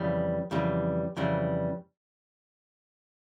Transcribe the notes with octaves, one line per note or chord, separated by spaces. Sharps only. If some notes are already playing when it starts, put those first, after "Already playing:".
Already playing: F2 C#3 E3 G3
F2 C#3 E3 G3
F2 C#3 E3 G3